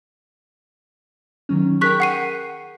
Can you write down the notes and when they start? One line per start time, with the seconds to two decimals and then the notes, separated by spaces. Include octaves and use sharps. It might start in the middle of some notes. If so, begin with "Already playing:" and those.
1.49 D#3 F#3 C#4
1.81 G#4 A#4 G5 C#6 F#6 B6
2.00 F#5 C7 D#7